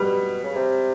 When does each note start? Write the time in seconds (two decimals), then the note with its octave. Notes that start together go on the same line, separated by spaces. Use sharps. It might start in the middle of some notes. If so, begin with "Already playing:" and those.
Already playing: B2 G3
0.44 C#3
0.56 C3